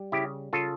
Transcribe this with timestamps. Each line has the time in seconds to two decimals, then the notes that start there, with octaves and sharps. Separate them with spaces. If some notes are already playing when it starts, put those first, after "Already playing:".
Already playing: G3
0.12 C#3 E4 G4
0.53 C#3 F4 A4